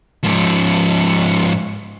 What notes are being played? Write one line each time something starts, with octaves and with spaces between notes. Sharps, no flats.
G#2 F3